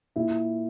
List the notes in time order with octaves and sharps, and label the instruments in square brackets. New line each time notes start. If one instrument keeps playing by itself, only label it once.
[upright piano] A#2 E4